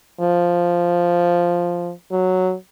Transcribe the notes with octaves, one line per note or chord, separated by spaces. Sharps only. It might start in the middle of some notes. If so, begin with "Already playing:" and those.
F3
F#3